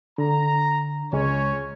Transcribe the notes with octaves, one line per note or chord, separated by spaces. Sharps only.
D3 A#5
C#2 G#3 C#4 C#5